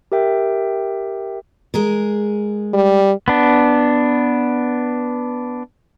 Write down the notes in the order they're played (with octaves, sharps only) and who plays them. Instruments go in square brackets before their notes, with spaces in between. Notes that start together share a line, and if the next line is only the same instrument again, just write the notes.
[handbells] G4 A#4 E5 G5
[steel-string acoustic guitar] G#3 G#4 A#4
[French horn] G3
[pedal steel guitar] B3 D4